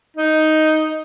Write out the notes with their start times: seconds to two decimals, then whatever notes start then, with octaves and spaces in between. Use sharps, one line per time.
0.17 D#4